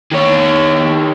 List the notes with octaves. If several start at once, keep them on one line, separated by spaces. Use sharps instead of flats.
D#3 C#5